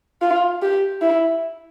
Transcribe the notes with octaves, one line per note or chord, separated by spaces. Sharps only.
F4
G4
E4